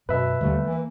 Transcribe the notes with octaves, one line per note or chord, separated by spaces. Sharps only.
F#2 B2 B4 E5
D#2 D3 G3 A3
E3 A#3